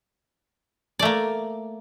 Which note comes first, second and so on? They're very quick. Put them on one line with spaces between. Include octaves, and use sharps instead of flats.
D5 A3 A#3